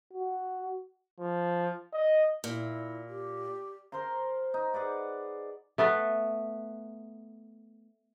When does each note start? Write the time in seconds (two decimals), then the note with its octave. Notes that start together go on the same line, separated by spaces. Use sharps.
0.14 F#4
1.20 F3
1.93 D#5
2.44 A#2 E4
3.09 G4
3.92 A#4 C5 A#5 C6
4.54 D#4
4.74 G#4 B4 D5 F#5
5.78 A3 B3 A4 B4